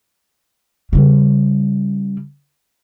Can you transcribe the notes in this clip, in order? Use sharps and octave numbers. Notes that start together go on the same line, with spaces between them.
C#3 G3